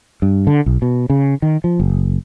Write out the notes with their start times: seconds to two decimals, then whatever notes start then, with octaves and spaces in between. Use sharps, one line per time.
0.22 G2
0.47 D3
0.66 B1
0.82 B2
1.10 C#3
1.42 D#3
1.64 F3
1.80 F#1